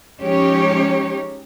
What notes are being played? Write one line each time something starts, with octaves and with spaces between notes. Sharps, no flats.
F3 G#3 C#4 D#4 G4 C#5